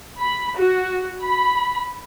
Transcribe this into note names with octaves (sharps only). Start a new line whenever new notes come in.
B5
F#4
B5